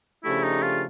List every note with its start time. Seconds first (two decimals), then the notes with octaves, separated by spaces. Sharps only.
0.24 C#3 F3 A3 D4 E4 G4
0.43 D#4
0.63 F4